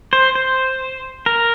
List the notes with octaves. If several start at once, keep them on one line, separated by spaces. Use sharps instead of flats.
C5
C5
A#4